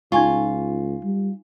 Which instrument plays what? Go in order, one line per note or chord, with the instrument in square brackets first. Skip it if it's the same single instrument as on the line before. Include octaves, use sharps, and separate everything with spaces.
[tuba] C#2 [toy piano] D#4 G#5 C#6 [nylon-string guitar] F4
[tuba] G3